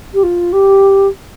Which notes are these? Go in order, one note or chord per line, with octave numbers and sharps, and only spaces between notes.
G4
F4
G4